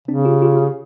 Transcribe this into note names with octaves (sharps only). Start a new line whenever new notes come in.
C#3 C4 D4
F4 G4
F4 G4